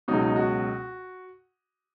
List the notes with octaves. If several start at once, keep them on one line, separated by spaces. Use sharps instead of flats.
C#2 B2 F#3 D#4
D#4
F#4